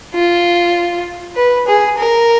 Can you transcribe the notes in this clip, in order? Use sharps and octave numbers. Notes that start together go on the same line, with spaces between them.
F4
B4
G#4
A#4